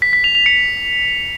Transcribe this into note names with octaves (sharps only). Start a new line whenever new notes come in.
B6
B6
F7
F7
C#7